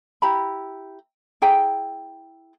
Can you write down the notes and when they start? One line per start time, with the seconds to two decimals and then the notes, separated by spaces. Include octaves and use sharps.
0.22 E4 G4 A#5 B5
1.42 E4 G#4 G5 A#5